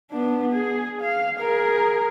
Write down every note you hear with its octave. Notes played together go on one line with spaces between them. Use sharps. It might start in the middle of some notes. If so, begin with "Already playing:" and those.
B3 D4
G#4
F5
G#4 A#4